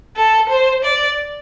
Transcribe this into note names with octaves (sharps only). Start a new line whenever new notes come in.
A4
C5
D5